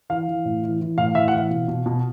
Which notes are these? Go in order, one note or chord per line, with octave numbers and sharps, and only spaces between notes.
E3 F5
E3
A2
E3
E3
A2 F5
A2 E5
F#5
E3 F5
B2
B2
B2